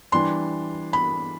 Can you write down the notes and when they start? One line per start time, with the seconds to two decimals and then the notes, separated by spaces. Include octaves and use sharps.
0.12 E3 G3 D4 C6
0.93 B5